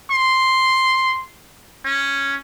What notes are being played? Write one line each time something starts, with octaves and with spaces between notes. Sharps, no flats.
C6
C#4